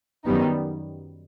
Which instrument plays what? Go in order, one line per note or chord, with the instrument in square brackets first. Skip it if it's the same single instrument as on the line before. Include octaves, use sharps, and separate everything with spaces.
[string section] F#2 D#3 G3 B3 D#4